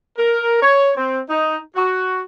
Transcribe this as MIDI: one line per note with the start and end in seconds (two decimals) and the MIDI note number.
0.18 0.59 70
0.62 0.91 73
0.97 1.20 60
1.30 1.58 63
1.76 2.21 66